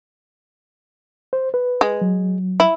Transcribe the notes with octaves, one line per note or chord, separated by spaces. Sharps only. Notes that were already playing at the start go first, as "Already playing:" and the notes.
C5
B4
G#3
F#3
E4